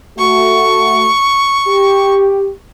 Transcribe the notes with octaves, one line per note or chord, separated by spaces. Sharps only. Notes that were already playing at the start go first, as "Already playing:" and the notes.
A3 F#4 C#6
G4